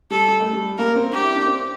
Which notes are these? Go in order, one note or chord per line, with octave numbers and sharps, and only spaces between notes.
G3 A4
G3
A3
G3
A#3 A#4
C4
D4 G4
E4
D4
C4